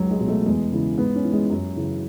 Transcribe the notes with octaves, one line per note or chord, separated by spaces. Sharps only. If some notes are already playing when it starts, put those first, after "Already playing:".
Already playing: C#2 F#3
G#3
B2
A3
E2 G#3
C#3 E3
G#2 B3
C#4
E3
G#3
F#2 F#3
C#3 E3